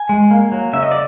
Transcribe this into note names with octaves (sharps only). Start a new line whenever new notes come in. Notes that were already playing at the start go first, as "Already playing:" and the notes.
Already playing: G#5
G#3
A#3
F#3
C#3 E5
D#5
D5